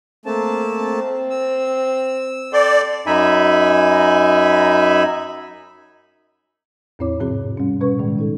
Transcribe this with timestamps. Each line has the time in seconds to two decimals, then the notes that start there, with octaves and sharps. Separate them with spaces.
0.26 A3 A#3 C4 A5
0.79 C4
1.30 E6
2.53 A4 D5 G5 C6
3.06 F#2 D#4 E5 G#5 B5
6.99 E2 A2 C4 E4 C#5 D6
7.20 G#2 C3 F3 C4 F#4 G#4
7.57 G3 C#4
7.81 B2 G3 C#4 B4 C#6
7.99 A2 D#3 G#3
8.18 D#4 A4